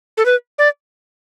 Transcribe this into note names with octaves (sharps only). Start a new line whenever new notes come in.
A4
B4
D5